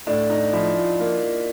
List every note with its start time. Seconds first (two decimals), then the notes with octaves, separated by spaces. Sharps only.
0.07 A2 D4
0.30 D#4
0.53 F3 E4
0.77 F4
0.99 A#3 F4